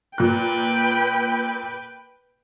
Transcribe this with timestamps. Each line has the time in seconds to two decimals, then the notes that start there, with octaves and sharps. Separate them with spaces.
0.18 A#2 B4 G5 F#6